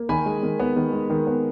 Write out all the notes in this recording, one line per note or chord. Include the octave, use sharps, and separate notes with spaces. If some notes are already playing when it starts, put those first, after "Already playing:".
Already playing: A#3
D#3 G#5 B5
G#3
D#3
B3
D#3
G#3
D#3
B3